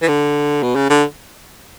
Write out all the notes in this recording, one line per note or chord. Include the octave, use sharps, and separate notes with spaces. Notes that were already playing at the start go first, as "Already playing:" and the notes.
E3
D3
B2
C#3
D3